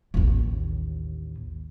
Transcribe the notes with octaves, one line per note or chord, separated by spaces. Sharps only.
A1 D#2